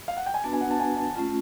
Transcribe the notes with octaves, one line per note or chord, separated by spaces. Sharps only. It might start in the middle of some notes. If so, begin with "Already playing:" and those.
F5
F#5
G5
G#5
B3 D4 F#4 B4 A5
G#5
F#5
A5
G#5
A5
A3 C#4 F4 A5